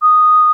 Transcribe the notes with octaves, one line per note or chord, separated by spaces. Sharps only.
D#6